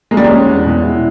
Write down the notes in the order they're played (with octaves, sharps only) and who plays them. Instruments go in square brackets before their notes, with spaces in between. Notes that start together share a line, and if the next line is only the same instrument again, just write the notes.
[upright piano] G#3 [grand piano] A#3
[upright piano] G3
[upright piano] G#3 [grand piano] C#4
[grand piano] E2
B2
E4